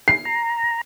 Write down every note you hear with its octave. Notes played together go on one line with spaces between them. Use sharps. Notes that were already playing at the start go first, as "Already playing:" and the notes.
C7
A#5